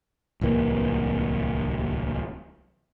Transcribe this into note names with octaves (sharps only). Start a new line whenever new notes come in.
D1 C2 E3 A#3